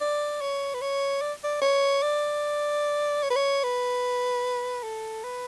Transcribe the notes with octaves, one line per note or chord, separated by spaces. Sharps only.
D5
C#5
B4
C#5
D5
D5
C#5
D5
C#5
B4
C#5
B4
A4
B4